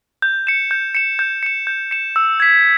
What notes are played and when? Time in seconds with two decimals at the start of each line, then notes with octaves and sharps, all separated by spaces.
0.22 G6
0.47 C#7 E7
0.71 G6
0.95 C#7 E7
1.19 G6
1.43 C#7 E7
1.67 G6
1.91 C#7 E7
2.16 E6
2.40 G#6 B6